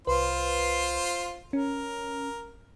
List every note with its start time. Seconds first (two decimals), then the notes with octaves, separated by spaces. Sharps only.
0.07 C2 F4 B4 C5
1.53 C#4 A#4